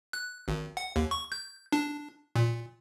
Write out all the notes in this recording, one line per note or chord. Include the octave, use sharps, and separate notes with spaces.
F#6
G#1
F#5
D#2
C#6
G6
D4
A#2